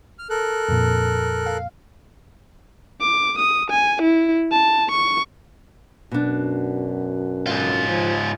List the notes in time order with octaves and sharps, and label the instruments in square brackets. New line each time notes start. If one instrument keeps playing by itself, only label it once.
[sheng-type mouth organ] F6
A4 A#4 F#6
[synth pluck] F2 A#2
F5
[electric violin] D6
D#6
G#5
E4
A5
C#6
[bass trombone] F#2 [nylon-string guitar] B2 D4
[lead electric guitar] G#2 F4
[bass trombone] F3